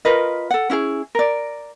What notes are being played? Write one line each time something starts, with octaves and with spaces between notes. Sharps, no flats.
F4 A#4 B4 D#5
A4 F#5
C#4 E4 G4 G#4
A#4 D5